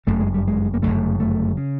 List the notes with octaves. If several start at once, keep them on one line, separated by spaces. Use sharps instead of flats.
G1 F#2 C#3 A3
G#3
G3
G#3
A#3
G1 F#2 C#3 A3
A3
C#3